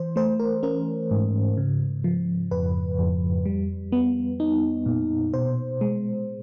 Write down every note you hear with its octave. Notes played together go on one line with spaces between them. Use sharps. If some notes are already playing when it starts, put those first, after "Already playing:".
Already playing: E3 C5
A3 C5
A#4
C#4 A#4
G#2
C#3
F3
F2 B4
F2
G3
B3
D#4
A#2
B2 C5
G#3